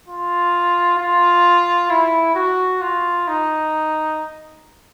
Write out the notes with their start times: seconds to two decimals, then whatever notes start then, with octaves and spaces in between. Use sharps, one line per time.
0.08 F4
0.99 F4
1.90 E4
2.35 F#4
2.81 F4
3.28 D#4